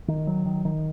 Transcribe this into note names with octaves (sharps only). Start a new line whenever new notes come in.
D#3
F#3
D#3
D#3